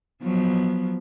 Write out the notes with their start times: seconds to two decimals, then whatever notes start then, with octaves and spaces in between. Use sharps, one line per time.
0.22 F3 F#3 B3